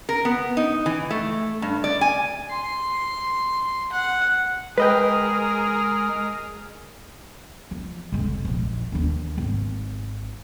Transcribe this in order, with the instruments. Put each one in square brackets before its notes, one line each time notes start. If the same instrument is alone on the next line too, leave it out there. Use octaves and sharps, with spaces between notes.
[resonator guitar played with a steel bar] A#4
B3
D#4
E3
A3
G2
D5
G#5
[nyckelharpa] C6
F#5
[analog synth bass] G#3 [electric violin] G#4 A#4 [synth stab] B4 D#5 G5
[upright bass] F3
F1 G#3
A#1 F3
D#2 D4
G#1